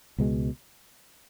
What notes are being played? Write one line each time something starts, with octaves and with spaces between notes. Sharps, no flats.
C#2 B2 G#3